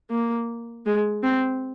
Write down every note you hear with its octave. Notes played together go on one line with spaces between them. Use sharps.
A#3
G#3
C4